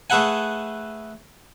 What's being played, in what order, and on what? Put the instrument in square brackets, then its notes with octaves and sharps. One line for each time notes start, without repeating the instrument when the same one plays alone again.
[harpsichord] A3 G#4 A4 B4 F#5 G#5